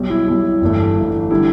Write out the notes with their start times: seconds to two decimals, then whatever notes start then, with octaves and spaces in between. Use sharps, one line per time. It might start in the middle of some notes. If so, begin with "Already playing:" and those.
Already playing: B1 B2 G3
0.10 E4
0.27 B1 B2 G3 E4
0.61 G1 G2 E3 A3
0.96 G1 G2 E3 A3
1.31 D3 G3 E4